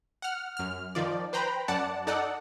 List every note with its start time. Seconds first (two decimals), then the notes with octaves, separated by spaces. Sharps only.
0.22 F#5 F6
0.57 F#2 F6
0.95 D#3 F3 D5
1.33 B4 C5 G5 A#5 B5
1.68 F#2 D5 F#5 A5
2.07 D#4 A4 D5 F#5